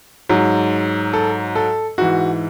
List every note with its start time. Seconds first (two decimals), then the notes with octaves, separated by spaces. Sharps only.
0.29 G#2 F#3
1.13 A4
1.55 A4
1.98 G#2 E3 F#4